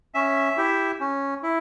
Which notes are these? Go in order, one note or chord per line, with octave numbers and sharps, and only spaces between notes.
C#4 E5
E4 G4
C#4
E4